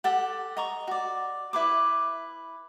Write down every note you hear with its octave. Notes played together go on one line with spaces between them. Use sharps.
G4 A4 F#5
D#5 A#5 C#6
F#4 D5
E4 B4 D6